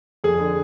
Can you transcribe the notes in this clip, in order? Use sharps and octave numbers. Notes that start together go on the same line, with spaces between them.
F2 G#4
D3